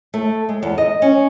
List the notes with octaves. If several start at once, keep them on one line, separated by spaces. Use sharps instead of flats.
A3
G#3
E2
D#5
C#4